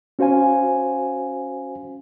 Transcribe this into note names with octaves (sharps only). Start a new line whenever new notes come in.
C#4 F#4 C5 F5 G#5